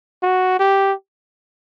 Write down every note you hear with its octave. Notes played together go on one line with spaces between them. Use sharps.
F#4
G4